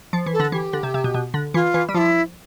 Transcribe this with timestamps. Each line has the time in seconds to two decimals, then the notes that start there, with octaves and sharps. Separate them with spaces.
0.13 F3
0.26 E3
0.33 A4
0.40 D3
0.52 E3 G4
0.73 D3
0.83 C3
0.94 C3
1.04 B2
1.14 B2
1.34 D3
1.54 E3 F4
1.74 E3
1.89 G3
1.94 F3 E4 F4